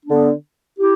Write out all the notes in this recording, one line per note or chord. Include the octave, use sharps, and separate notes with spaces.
D3 B3 D4
E4 G4